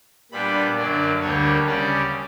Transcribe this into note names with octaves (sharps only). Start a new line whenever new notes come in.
A#2 G3 B3 D4 B5
F#2 D3 F#3 A#3 D5
D2 D3 G3 A#3 C#5
C#3 G3 C#4 D5